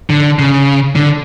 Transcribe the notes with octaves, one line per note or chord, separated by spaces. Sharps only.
D3
C#3
D3